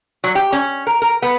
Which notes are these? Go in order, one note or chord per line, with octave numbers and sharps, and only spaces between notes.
F#3
G4
C#4
A#4
A#4
B3